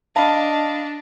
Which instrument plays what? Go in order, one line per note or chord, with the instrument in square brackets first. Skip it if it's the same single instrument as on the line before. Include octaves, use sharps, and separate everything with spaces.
[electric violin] D4 [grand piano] D#5 F5 B5 [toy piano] A5